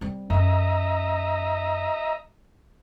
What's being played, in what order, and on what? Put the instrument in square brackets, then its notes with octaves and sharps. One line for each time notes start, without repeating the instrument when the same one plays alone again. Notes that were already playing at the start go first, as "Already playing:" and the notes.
[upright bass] G3 C4
[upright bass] F#2 C#4 [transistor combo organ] D#5 E5 A#5